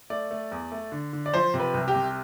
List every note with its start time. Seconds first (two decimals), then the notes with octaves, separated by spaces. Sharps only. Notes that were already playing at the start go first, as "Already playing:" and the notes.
0.10 A3 D5
0.31 A3
0.52 E2
0.72 A3
0.92 D3
1.13 D3
1.26 D5
1.33 F3 C5
1.54 C3
1.60 B4
1.74 C2
1.88 G4
1.95 C3